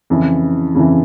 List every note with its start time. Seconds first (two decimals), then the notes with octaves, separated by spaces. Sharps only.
0.10 F2 C#3 E3
0.75 F2 C#3 E3